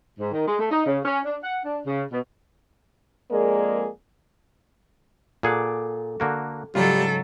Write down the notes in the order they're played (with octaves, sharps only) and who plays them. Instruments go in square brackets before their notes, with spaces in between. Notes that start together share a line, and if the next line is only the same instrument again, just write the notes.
[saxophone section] G#2
D#3
G#3
A3
D#4
C#3
C#4
D4
F#5
D4
C#3
B2
[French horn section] F2 G#3 A#3 G#4 A#4 D5
[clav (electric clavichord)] A#2 G#4 F#5 [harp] A4 D6
[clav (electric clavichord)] D3 A#3 F#4
[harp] G#2 C#3 [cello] F#3 A4 [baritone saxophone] G3 [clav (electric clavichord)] F4